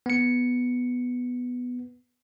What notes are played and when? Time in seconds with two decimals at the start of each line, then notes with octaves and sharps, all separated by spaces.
0.06 B3 C#7